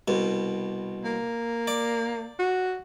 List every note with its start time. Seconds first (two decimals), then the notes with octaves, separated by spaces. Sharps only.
0.08 C2 B2
1.04 A#3
1.67 D5
2.39 F#4